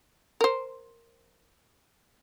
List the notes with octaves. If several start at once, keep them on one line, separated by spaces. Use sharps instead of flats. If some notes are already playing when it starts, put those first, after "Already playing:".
A#4 C5